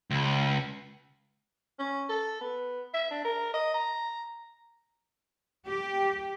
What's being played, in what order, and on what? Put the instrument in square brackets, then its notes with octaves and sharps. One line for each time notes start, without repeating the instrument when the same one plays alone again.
[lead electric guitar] C#2
[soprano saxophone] C#4
A4
B3
E5
D4
A#4
D#5
A#5
[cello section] G4